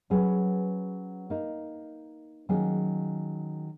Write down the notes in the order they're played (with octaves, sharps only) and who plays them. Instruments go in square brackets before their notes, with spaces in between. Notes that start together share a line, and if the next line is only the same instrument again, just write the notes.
[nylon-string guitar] F#3 C#4 G#4 B4
A#3 D#4 A#4
D#3 F#3 A#3 C#4 G#4